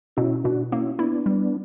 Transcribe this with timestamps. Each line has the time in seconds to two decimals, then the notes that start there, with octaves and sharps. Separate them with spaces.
0.17 B2 C#4 E4
0.44 B2 D4 F#4
0.72 A#3 C#4 E4
0.99 B3 D4 E4
1.26 G3